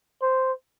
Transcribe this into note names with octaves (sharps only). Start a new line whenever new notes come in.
C5